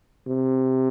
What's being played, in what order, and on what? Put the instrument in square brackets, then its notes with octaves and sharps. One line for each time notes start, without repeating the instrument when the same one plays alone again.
[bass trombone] C3